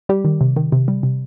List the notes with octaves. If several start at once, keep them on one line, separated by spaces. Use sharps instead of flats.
G3 G4
D#3
C3
D#3
C3
G3
C3